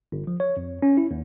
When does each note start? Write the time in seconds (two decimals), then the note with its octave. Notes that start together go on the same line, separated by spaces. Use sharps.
0.12 G1
0.27 F3
0.40 C#5
0.57 F2
0.82 C#4
0.97 E4
1.11 D#2